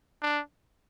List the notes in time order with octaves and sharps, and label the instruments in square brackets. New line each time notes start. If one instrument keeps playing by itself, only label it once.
[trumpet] D4